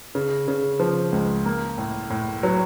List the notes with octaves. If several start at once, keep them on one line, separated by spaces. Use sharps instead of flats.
C#3
C#3
F3
C#2
A#3
A2
A2
F#3